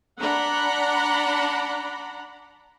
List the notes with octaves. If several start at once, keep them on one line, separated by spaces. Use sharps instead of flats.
D4 F#5 A#5 B5